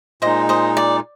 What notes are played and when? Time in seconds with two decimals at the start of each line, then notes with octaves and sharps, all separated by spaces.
0.22 A#2 G#3 D#4 C5 D#5
0.49 C5 D#5
0.77 D5